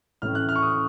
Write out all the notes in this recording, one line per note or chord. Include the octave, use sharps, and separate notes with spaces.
A1 A2 A3 C#4 F6
F#6
F6
C#6
D#6